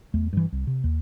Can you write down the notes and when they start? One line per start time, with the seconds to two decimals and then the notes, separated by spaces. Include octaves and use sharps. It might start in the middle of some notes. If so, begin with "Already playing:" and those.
0.14 E2 A3
0.33 G2 E3
0.52 C2
0.67 C3
0.84 D#2